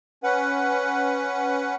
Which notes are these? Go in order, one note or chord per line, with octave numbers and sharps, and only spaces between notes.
C#4 B4 F#5